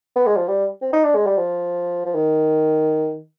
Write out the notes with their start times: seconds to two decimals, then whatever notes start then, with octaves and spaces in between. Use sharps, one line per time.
0.15 B3
0.26 G#3
0.36 F3
0.48 G3
0.81 C4
0.93 D#4
1.04 D4
1.15 G#3
1.26 G3
1.37 F3
2.05 F3
2.15 D#3